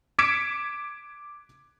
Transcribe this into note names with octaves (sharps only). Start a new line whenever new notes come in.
D6 G#6 B6 C#7 D7 E7